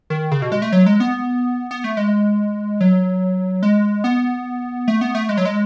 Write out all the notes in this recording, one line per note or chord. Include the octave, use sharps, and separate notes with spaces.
D#3
C#3
B2
G#3
A3
F#3
G#3
B3
B3
A3
G#3
F#3
G#3
B3
A3
B3
A3
G#3
F#3
G#3